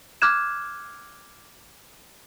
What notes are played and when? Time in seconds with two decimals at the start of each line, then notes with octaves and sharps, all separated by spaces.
0.22 D6 F6 F#6 G#6 E7